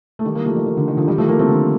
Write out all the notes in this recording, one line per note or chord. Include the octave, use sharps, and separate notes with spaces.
A3
D#3 G3
G3 A#3
F3 A3
D#3
D#3
D3
D#3
D3 F3
D#3 G3
F3 A3
G3 A#3
A3 C4
D3